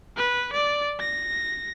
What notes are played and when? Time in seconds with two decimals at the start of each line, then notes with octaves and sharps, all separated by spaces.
0.17 B4
0.53 D5
1.00 A#6